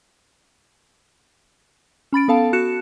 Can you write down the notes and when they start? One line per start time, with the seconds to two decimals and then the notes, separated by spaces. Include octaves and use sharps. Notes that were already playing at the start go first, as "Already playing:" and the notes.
2.13 C#4 B5 A6 D7
2.28 B3 A4 F5 A5
2.53 F#4 F#6 C#7 E7